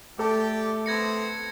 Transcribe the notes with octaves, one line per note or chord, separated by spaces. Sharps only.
A3 G4 A4 D5 G5
B3 C4 G#6 A#6 C#7